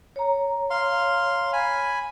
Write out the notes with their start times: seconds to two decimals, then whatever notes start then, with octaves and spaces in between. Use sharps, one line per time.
0.16 C#5 A#5
0.70 F5 C6
1.53 G#5 B5